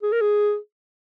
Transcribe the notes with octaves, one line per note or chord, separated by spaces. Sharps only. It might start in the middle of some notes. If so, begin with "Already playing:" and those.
G#4
A#4
G#4